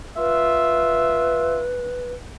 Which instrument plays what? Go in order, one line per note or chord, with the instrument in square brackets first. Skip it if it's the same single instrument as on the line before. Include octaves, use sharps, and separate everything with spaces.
[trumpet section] F4 E5 [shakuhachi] B4